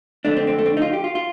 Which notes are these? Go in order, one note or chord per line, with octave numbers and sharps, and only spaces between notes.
F2 D3 A3 D4
C4
C4
A3
C4
D4
D#4
F4
G4
F4
F4